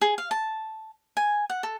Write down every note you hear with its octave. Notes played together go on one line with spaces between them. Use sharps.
G#4
F5
A5
G#5
F#5
A4